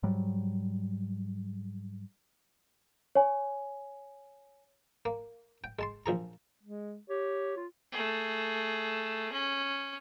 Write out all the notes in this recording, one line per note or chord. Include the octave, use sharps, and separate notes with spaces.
G#2 F#3 G3
C#5 G#5
A#3
G5
G#3 A5 C6
A#1 F3 G#4 A#5
G#3
G4 C#5
F4
A3 G#4
C#4